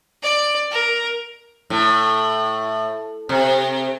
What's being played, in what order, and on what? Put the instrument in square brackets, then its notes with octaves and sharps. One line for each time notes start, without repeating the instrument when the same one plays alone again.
[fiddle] D5
A#4
[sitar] A2
C3